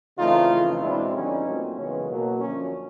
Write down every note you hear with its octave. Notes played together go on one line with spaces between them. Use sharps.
C#3 E3 A3 C4 D#4 F4
F2 C#3 E3 A3
E2 B2 G#3 C4 D4 E4
F2 D3 G3 B3 C#4 D#4
A#2 F#3 A3 C4
F#2 C#3 E3 G#3 B3 C#4
B2 F#3 A#3
F#2 D3 F3 C#4